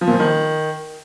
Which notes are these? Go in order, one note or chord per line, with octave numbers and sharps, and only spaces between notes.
F3
A#2
F3
D#3